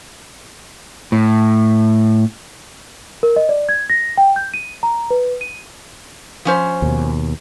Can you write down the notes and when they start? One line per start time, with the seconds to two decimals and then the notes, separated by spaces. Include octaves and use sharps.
1.12 A2
3.23 A#4
3.36 D#5
3.49 D5
3.69 G#6
3.90 A#6
4.18 G5
4.36 G6
4.54 D#7
4.83 A#5
5.11 B4
5.41 D#7
6.45 F3 C#4 C5
6.82 D#2 B2